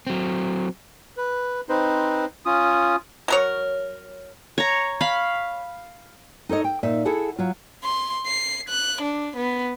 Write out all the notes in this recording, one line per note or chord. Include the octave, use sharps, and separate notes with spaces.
F#3 C4
B4
C4 D#4 B4 C5
C#4 F4 D#6
F#3 A#4 C#5
C#5 A#5
F5 B5
D#4 A4 C#5 D#5
G5
A#2 D#4 E5
E4 G#4 A4 F#5
F#3 F4
C6
C7
F#6
D4
B3